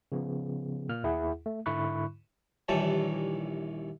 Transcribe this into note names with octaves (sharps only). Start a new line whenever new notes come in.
C#3 F3 B3
A#2 A#3 F6
D#2 E4 G#4 F#5
A3
G#2 D3 E4 B5 C#6 F#6
A#1 D#2 E3 G3 C#5 A5